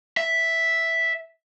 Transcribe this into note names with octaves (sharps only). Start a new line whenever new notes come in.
E5